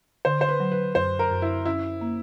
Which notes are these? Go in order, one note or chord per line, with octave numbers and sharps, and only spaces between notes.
D3 C5
C5
B4
F#3
B4
F#2 C5
A#4
F#2
E4
C#4 E4
A#3